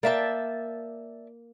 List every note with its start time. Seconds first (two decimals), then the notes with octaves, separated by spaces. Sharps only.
0.03 A#3 D5 E5 G5 A5